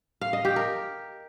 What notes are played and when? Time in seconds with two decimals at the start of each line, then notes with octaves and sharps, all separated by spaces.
0.21 F5
0.33 D#5
0.45 G4
0.56 A#4